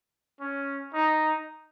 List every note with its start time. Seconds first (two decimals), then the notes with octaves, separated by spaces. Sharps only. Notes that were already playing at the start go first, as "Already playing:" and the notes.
0.40 C#4
0.93 D#4